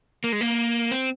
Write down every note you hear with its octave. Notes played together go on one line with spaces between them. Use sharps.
A#3
G#3
A#3
C4